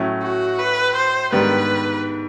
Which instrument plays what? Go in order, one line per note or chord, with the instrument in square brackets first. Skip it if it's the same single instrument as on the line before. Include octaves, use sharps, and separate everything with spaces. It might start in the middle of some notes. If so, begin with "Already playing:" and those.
Already playing: [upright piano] A2 F#3 A3 C#4 E4
[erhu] F#4
B4
C5
[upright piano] G#2 D#3 G3 B3 D4 [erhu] B4